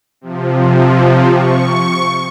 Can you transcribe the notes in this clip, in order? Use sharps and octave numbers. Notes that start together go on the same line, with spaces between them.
C3 F3
C#6